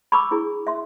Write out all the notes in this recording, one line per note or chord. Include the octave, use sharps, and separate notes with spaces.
B5 C#6 D6 E6
D4 E4 G#4
E5 C6